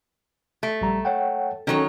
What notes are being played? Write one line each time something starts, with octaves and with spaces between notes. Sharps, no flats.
A3
A#1 G3 A#5
C#5 F#5 G5
D#3 F#3 C#4 A4 C#5